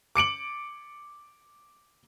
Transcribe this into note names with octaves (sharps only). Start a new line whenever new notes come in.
D6 C#7 D7 F#7